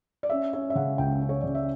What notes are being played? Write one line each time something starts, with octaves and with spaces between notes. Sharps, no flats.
D5
C#4 E5
C#4 E5
E5
C#3 F#5
C#2 G5
C#4
C#5
C#3 D5
E5